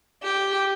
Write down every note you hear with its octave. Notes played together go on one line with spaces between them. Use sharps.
G4